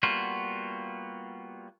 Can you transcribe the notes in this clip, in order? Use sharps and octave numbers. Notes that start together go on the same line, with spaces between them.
G3 A#3 B3 F4 F#4